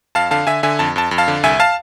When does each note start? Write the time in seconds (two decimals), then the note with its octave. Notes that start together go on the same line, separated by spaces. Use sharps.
0.15 F2 F5 A5
0.31 D3 F5 A5
0.47 D3 E5 G#5
0.63 D3 E5 G#5
0.79 F2 A5
0.96 F2 A5
1.11 F2
1.18 F5 A5
1.28 D3
1.43 C2 E5 G#5
1.60 F5 A5